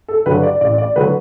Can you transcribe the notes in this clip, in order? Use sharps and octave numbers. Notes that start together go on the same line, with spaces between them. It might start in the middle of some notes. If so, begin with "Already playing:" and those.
A4
G2 D3 F#3 B4
D5
A1 D5
D5
D3 F#3 B4